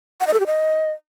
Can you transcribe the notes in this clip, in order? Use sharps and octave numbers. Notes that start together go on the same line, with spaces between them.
F#5
D#5
A4
G4
D#5